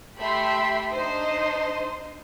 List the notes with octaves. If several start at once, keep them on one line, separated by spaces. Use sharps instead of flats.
A3 G4 E5 G5 B5 C6
D4 D#4 C5 D#5 C6